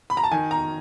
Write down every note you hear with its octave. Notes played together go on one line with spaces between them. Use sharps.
B5
A#5
A5
D#3 G#5
A#5